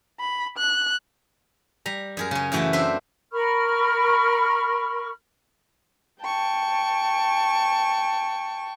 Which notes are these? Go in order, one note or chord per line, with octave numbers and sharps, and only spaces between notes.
B5
F#6
G3 A#5
F#2 G#4 A#4
C#3 C#4
F#2 E3 A3 F#4 G5 A5
C4 D4 B4 C5 E5
A#4 B5 C#6 F6
G5 A5 C#6